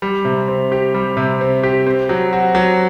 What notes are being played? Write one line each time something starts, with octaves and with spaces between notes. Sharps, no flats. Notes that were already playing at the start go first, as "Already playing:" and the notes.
G3
C3
C4
G4
G3
C3
C4
G4
C4
F#3
F#4
F#3